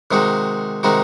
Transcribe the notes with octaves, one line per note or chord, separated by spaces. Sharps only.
C3 D#3 G#3 D#4 F#4
C3 D#3 G#3 D#4 F#4